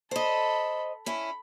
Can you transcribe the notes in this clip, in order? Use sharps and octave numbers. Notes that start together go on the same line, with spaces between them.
A4 C5 D#5 B5
C#4 E4 B5